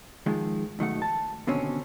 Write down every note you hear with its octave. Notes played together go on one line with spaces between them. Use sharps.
D#3 F3 G#3
B1 D#3 A3 F#5
A5
D#2 B2 D3 C4 C#4